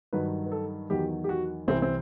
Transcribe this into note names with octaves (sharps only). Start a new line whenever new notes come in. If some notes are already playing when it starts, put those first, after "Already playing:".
G2 D#3 F#3 B4
B4
A4
E2 D#3 F#3 G4
G4
F#4
C2 C3 E3 C4
C4